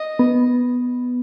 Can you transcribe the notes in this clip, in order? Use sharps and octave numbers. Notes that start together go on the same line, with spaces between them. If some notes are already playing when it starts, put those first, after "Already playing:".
Already playing: D#5
B3